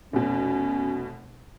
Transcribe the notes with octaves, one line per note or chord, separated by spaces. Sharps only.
F1 B2 C#4